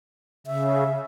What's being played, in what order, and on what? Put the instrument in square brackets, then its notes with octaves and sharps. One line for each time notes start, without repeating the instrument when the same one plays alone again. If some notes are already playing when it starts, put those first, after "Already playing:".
[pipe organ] C#3 [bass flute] E5